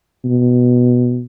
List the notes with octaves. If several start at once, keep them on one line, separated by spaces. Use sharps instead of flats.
B2